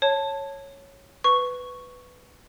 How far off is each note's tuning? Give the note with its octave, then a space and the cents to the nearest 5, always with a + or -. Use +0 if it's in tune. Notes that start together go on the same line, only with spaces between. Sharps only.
C#5 -5 A5 +0
B4 +10 C#6 +0